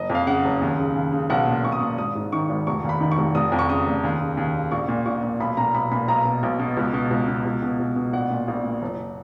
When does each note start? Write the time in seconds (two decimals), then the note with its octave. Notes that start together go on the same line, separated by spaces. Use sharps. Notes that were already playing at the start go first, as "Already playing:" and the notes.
Already playing: F#1 D#5
0.10 F2
0.15 F5
0.27 C#3 F#5
0.45 F#1
0.61 D#2
0.78 C#3
0.96 D#2
1.12 C#3
1.30 B1 F#5
1.47 A#2
1.63 B1 C#6
1.72 D#6
1.80 A#2 C#6
1.98 G#1 D#6
2.15 G#2
2.32 D#3 C#6
2.49 G#1
2.67 F1 C#6
2.84 D#2
2.89 B5
3.00 D#3
3.12 C#6
3.18 F1
3.35 F1 D#6
3.52 F2
3.59 C#6
3.69 C#3 D#6
3.86 F1
4.03 D#2
4.21 C#3
4.37 D#2
4.55 C#3
4.72 A#1 C#6
4.88 A#2
5.06 A#1 C#6
5.23 A#2
5.40 B1 B5
5.57 A#2 A#5
5.74 B1 B5
5.91 A#2 B5
6.08 B1 A#5
6.25 B2
6.43 B1
6.59 B2
6.77 C#2
6.94 B2
7.11 C#2
7.28 B2
7.45 C#2
7.62 B2
7.80 C#2
7.96 B2
8.13 A#1 F#5
8.31 A#2
8.48 A#1
8.64 A#2
8.82 F#1